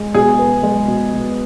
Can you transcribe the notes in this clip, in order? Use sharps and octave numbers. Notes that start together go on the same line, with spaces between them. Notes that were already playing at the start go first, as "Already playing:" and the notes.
Already playing: G#3
B2 G#4
B3
G#3
B2
B2